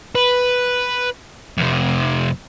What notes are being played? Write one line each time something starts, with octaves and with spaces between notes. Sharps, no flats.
B4
F2 C3